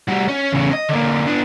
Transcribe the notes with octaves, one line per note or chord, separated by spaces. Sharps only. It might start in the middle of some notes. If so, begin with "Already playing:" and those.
G3 F#4
C#4
E2 C#3
D#5
D3 A#3
B3 D4